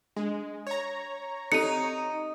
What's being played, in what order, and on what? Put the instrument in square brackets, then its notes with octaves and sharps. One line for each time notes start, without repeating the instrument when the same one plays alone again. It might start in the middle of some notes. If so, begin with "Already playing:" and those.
[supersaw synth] G#3 [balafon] D4
[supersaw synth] C#5 A#5
[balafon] C4 G4 A4 [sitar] D#4 [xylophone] C#7 D#7